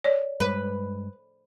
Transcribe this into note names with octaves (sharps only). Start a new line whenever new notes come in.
C#5 D5
G2 G3 G#3 B4